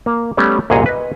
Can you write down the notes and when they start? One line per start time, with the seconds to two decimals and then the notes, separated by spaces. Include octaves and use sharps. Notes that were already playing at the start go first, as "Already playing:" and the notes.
0.06 A#3
0.37 G3 A3 B3 C#4
0.70 C2 F#2 A#2 G#4 C#5 D#5
0.86 B4 D#5